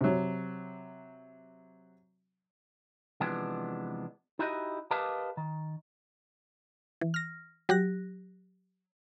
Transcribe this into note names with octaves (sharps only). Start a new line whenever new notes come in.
C3 F#3
C3 E3 F3 G#3 B3 D4
D#4 E4 F#4 G4 B4 D#5
G4 A#4 B4 D#5 F5 A5
D#3
E3
F6 A#6
F#3 G4 F#6 A#6